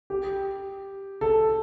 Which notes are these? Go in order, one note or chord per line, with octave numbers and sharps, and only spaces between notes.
G4
A4